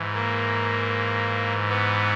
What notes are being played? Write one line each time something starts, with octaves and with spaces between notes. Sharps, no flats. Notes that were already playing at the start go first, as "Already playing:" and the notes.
Already playing: G#2 E3
A#3
B3